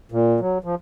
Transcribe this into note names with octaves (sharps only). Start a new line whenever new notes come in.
A#2
F#3
F3